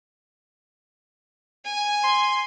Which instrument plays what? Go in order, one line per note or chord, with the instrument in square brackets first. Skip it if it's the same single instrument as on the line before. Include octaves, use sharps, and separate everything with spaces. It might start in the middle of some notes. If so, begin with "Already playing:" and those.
[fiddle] G#5
[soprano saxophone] C6